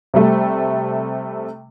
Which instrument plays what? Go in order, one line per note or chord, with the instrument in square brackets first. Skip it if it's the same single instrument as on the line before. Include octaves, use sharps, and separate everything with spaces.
[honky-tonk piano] C3 G3 A3